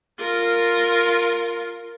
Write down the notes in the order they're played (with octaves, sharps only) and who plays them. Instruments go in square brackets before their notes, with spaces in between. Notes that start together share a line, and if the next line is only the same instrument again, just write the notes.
[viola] F4 A#4